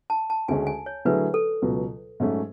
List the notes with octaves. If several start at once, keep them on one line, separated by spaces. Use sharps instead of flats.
A5
A5
D2 C#3 G#3 C#4 G#5
G#5
C#5
D3 F#3 A3 E4 G#4 B4
A4
C#2 B2 F#3
G#2 F#3 A3 C#4